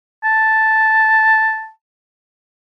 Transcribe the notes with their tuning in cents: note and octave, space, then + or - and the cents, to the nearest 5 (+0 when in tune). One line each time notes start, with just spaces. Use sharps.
A5 +0